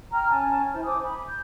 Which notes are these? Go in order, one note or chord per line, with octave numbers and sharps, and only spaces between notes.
G5 A#5 F6
C#4 G#5 A5
E4 C5
C5 G#5 D6 D#6
B5
G6